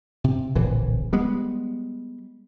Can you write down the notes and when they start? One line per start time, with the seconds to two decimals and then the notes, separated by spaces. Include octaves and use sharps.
0.24 C3
0.55 D1 A#1 E3
1.13 G3 G#3 B3